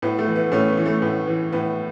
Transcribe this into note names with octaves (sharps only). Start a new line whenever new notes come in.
A2 B3
A3
E3
B3
A2 A3 C#4
B3
E3
A3
A2 B3
E3
A2 B3